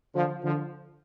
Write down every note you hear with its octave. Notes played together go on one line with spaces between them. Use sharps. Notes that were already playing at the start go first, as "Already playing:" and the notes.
D3 F3
D3 F3